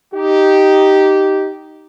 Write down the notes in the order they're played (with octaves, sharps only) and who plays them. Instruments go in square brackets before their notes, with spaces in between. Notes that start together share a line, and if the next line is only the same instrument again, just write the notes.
[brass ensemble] D#4 G4